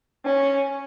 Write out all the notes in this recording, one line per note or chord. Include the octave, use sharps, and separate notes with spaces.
C#4